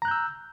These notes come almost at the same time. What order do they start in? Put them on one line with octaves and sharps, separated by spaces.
A#5 F#6 G6 E6